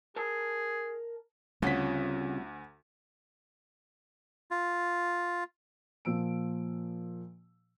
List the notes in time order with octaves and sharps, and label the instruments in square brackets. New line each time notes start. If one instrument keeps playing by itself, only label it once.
[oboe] G#4 [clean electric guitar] A#4 A5
[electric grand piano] D2 F#5 B6 [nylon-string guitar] C#3 F4 [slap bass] G3 C4
[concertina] F4
[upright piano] A#2 F3 E6 D7